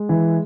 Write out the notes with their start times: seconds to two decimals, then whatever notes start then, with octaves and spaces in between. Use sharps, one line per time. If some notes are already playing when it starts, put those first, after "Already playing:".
Already playing: G#3
0.09 E3